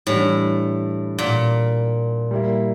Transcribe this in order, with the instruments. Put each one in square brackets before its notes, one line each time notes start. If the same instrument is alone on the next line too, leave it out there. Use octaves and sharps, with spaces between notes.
[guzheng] A2 [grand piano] E3 G3 D4
[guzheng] A#2
[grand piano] G3 A#3 E4